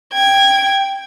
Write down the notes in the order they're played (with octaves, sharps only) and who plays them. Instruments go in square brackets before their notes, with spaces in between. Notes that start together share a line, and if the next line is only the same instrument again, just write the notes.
[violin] G5 G#6